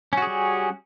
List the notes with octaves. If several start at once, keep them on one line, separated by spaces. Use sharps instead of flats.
G3 C#4 F#4 G#4